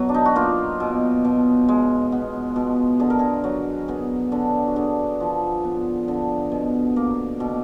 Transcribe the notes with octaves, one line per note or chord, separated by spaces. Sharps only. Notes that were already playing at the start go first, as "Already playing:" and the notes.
Already playing: B2 F#3
D4
D#4
F#4
A#3 F4
B2
B2
G#3
B3
B2
D3 G#4
A#4
G#4
F#3
B3 G#4
D3
F#4
D3 G#4
F3
B3
D3
B2
A#3
B2